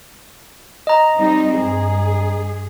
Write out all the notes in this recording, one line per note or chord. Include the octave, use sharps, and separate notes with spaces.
D#5 A#5
G3 C4 D#4
G2 G#4